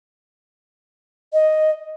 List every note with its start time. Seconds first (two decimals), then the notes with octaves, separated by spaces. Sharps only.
1.33 D#5